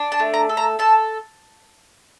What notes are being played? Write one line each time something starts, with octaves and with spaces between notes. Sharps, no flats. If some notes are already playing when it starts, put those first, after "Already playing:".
Already playing: D4
A5
A3
A#5
A4
A#5
A4 A5